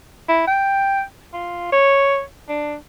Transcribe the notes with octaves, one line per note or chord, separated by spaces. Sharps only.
E4
G5
F4
C#5
D4